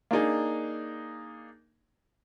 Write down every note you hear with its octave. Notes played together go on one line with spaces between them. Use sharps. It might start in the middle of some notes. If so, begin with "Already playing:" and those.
A#3 D4 D#4 G#4